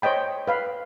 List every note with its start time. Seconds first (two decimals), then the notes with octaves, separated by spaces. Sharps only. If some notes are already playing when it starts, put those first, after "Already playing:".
0.02 C5 C#5 D#5 G5 B5
0.48 B4 F5 B5